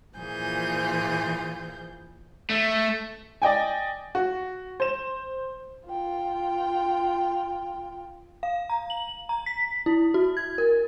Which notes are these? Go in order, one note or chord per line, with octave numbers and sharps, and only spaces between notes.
A#2 E3 F3 G#4 G6
A3
D5 D#5 G5 G#5
F#4
C5 E7
F4 G5
F5
A#5
F#7
A#5
B6
E4
F#4
G#6
A#4